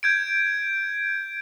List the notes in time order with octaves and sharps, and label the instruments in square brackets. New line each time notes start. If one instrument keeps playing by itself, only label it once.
[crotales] G6 G#6 D7